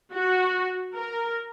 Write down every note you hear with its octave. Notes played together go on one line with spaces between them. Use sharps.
F#4
A#4